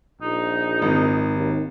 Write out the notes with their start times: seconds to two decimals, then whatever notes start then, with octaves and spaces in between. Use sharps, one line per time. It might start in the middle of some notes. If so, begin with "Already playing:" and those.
0.22 A#1 D#4
0.82 G#1
1.35 D#2